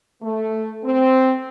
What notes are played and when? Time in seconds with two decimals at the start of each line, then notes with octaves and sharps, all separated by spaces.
0.22 A3
0.83 C4